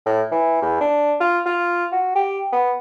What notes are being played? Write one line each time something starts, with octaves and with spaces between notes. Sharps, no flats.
A2
E3
E2
D4
F4
F4
F#4
G4
B3